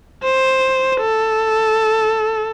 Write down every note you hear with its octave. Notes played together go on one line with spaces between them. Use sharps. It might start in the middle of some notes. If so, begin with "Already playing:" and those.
C5
A4